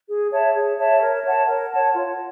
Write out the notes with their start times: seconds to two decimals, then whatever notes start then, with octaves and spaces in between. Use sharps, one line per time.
0.08 G#4
0.32 C#5 E5 A5
0.54 G#4
0.79 C#5 E5 A5
1.01 A#4
1.24 C#5 F#5 A5
1.48 A#4
1.71 C#5 F#5 A5
1.95 F4